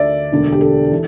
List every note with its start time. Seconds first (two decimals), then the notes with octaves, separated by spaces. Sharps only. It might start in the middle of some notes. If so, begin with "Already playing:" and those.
Already playing: D2 D3 D5 E5
0.32 E1 D2 D3
0.52 G4
0.61 A4
0.91 E3